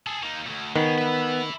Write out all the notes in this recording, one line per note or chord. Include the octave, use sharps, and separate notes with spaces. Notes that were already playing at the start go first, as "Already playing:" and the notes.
G#4 A4
A#3 D#4
D2 A#2
D#3 B3 G#4 C#5
B4 E5